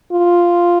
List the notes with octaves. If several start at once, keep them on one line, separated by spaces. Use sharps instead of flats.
F4